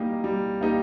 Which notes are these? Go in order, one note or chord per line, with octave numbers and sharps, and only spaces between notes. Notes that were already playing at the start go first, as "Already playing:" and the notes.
Already playing: G3 A#3 D#4 G4
G3
A#3 D#4 G4